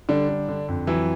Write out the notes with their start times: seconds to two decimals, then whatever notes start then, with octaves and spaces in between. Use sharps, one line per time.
0.09 D3 G3 D4
0.29 D3
0.49 D3
0.68 F2
0.87 E3 F#3 E4